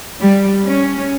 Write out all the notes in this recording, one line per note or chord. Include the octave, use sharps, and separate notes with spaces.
G3
C#4